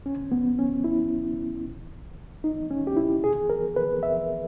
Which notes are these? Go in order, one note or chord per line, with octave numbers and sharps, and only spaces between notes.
C#4
B3
C#4
E4
D#4
C#4
G4
E4
G#4
A#4
B4
E5